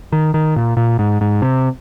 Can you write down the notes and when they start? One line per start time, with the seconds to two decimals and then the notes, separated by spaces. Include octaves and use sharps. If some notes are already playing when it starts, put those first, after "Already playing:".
0.12 D#3
0.34 D#3
0.56 A#2
0.77 A#2
0.99 G#2
1.21 G#2
1.42 C3